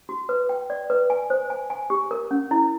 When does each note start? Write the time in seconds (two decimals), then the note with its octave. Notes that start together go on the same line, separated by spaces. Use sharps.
0.09 F#4
0.29 B4
0.49 G5
0.70 D5
0.90 B4
1.10 G#5
1.30 C5
1.50 G#5
1.70 G#5
1.90 G4
2.11 A#4
2.31 C#4
2.51 E4